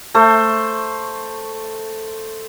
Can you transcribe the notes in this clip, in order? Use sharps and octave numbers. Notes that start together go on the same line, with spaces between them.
A3 C5